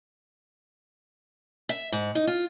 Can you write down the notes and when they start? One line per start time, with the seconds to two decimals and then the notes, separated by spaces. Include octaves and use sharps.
1.69 E5
1.92 G#2
2.15 D#4
2.27 F4